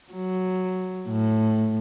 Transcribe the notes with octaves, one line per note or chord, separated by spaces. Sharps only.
F#3
A2